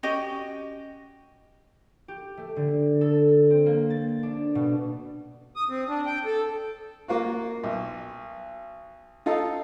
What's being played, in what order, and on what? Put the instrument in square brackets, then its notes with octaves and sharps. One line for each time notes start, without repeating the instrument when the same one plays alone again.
[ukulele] C#4 F#4 G4 D#5
[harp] G4
A3
D3
A4
C4
A#3
A6
D4
B2
[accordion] D#6
C4
D4
G5
A4
[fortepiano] A#3 F4 F#4
B1
D#4 F4 A4